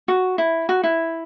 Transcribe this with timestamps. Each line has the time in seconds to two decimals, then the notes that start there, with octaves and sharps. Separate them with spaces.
0.08 F#4
0.38 E4
0.69 F#4
0.84 E4